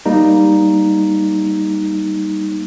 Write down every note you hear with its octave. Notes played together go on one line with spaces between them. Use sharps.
G3 A#3 D#4